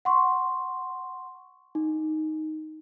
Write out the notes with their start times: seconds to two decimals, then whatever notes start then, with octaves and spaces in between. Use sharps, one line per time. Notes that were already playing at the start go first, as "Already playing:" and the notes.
0.05 F#5 C6 C#6
1.75 D#4